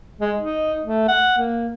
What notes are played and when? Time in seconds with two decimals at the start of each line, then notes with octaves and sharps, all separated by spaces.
0.21 G#3
0.38 D#4
0.84 A3
1.08 F#5
1.38 A#3